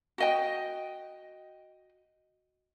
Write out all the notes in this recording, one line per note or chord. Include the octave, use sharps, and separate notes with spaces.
F#4 D#5 G5